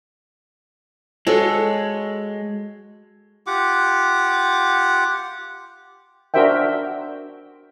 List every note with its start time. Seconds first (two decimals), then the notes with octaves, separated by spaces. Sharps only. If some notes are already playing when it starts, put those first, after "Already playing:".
1.27 G#3 F#4 A4 C#5
3.47 F4 G4 F#5 D6
6.34 D4 F#4 A#4 C5 E5 G5